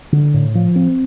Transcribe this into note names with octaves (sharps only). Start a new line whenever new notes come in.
D3
A2
F3
C4